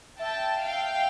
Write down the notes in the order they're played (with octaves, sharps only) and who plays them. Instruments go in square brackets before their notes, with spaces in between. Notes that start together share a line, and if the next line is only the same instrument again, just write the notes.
[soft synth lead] E5 [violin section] G5 A5
[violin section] F5 G5